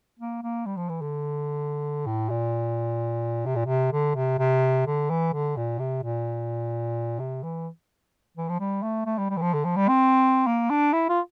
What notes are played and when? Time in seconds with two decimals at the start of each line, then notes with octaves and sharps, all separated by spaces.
0.20 A#3
0.43 A#3
0.66 G3
0.77 F3
0.89 E3
1.02 D3
2.06 A2
2.30 A#2
3.46 C3
3.56 A#2
3.65 C3
3.92 D3
4.16 C3
4.39 C3
4.87 D3
5.10 E3
5.33 D3
5.57 A#2
5.79 C3
6.03 A#2
7.19 C3
7.44 E3
8.37 E3
8.49 F3
8.60 G3
8.82 A3
9.06 A3
9.18 G3
9.30 G3
9.37 E3
9.42 F3
9.53 D3
9.65 F3
9.76 G3
9.89 C4
10.47 A#3
10.70 D4
10.93 E4
11.09 F4